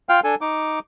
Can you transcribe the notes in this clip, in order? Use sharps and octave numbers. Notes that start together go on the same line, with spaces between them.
F4 F5 G5 F6
D4 A4 G#5
D#4 D6